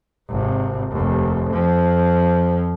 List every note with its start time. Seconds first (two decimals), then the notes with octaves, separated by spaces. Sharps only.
0.29 G#1 C3
0.91 F1 D#2
1.51 F2 F3